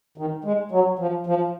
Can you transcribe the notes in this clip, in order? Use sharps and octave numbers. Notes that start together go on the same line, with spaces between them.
D#3
G#3
F#3
F3
F3